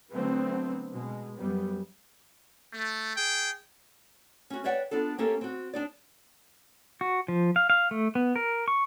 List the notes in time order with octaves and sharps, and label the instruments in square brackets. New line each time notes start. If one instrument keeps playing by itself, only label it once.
[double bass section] D3 F#3 A3 B3 C4
B2 G#3
F#2 G3 B3
[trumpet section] A3
G#4 G5
[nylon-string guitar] C#4 F#4
B4 C#5 D5 E5 F#5 G5
B3 D4 F4 A4
A#3 C#4 G4 A4 A#4
C4 F#4
D4 D#4 D5
[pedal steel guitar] F#4
F3
F5
F5
A3
B3
A#4
C#6